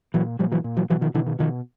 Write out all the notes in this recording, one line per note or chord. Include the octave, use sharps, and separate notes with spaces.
A#2 E3 F#3
A#2 F3 G3
E3 F#3
A#2
E3 F#3
B2 E3 F#3
D#3 F3
B2 D3 E3
D#3
B2 D#3 F3